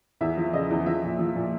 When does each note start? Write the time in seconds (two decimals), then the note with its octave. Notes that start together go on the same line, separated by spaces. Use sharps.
0.21 E2 E5
0.37 F3
0.53 C#3 D#5
0.70 E2
0.86 F3 E5
1.03 A#2
1.19 F3
1.35 A#2